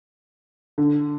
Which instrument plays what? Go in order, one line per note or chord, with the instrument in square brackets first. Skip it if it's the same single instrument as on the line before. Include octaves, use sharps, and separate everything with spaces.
[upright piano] D3